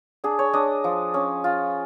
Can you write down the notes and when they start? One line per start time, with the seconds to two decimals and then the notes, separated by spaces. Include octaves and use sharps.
0.24 D4 G#4
0.39 C#5
0.53 D4 D#5
0.84 F3
1.14 C#4
1.44 F4